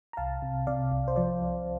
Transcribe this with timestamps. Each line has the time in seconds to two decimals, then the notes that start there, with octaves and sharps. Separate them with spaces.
0.13 A#5
0.17 C2 F5 A5
0.42 C3
0.67 C3 D5 F5
0.92 C2
1.08 C5
1.16 F3 D5
1.42 C2